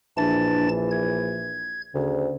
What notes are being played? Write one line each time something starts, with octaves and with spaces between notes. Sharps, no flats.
A#1 E3 D4 A5 A6
G#6
D2 C#3